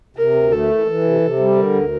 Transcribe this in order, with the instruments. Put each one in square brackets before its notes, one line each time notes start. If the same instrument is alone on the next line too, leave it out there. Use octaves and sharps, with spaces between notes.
[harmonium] C3 [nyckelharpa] A#4
[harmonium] D2
[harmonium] A3 [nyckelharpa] A4
[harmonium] E3
E3
C3
C3
G3
[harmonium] D3 [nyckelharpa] A#4
[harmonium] D2